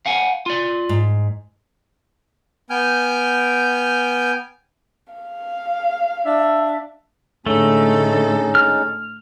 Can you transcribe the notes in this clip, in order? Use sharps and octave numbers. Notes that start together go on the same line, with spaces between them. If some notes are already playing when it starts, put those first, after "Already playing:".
F5 F#5 G#5
F4 D5
G#2
B3 G5 G#5 F6 G6
F5
D4 E5
A2 D3 G#3 A3 C#4 D#4 A4
F6